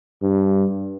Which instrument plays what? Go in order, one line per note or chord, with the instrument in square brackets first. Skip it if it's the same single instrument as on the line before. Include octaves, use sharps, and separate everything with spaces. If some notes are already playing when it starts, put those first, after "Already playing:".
[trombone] G2